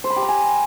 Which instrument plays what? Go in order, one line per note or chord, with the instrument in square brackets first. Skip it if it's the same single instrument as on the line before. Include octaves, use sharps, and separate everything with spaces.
[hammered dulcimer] C5
B5
G4
A#5
G#5